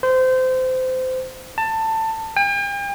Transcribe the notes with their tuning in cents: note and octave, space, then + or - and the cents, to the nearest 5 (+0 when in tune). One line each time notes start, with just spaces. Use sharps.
C5 -25
A5 +20
G5 +45